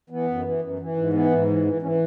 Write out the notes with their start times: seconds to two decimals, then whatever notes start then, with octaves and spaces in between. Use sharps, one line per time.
0.10 E3 B3
0.28 F#2
0.45 E3
0.62 F#2
0.79 E3
0.96 G#2
1.13 E3 B3
1.31 G#2
1.48 E3
1.65 E3
1.82 E3 C#4